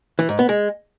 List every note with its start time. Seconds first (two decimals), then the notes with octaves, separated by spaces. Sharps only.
0.19 E3
0.29 G#2
0.39 B3
0.49 G#3